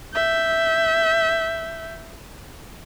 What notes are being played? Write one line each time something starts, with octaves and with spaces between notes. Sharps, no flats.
E5 G6